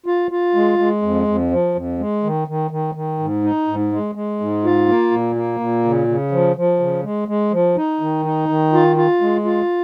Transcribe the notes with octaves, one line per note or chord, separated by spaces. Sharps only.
F4
F4
G#3
G#3
F2
F2
F3
F2
G#3
D#3
D#3
D#3
D#3
G#2
D#4
G#2
G#3
G#3
G#2
F4
A#3
A#2
A#3
A#2
C#3
C#3
F3
F3
C#3
G#3
G#3
F3
D#4
D#3
D#4
D#3
F4
F4
G#3
F4